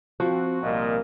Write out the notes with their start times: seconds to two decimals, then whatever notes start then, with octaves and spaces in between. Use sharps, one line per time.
0.20 F3 C4 F#4
0.63 C2 A#2 A#3 D#5